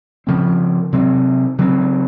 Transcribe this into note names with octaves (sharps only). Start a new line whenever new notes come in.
C#3 F3 C4
C3 F#3 C4
C#3 F#3 C4